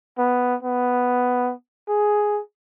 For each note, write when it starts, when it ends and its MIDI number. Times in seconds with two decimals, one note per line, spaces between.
0.18 0.56 59
0.63 1.53 59
1.89 2.41 68